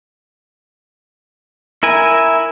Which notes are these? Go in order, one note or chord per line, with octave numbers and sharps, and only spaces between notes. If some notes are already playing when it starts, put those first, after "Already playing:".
E4 A#4 G#5